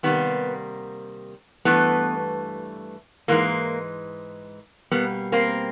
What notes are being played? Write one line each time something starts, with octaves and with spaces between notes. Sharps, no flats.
C3 D#3 G3 A#3 B3
G2 E3 A3 B3
G#2 E3 G#3 A#3
B2 G3 A#3 B3
A#3 C4